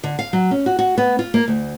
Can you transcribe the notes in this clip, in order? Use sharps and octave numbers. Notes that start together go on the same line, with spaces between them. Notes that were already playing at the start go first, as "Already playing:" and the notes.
D3
F5
F#3
C#4
F#4
F#4
B3
F4
A#3
D2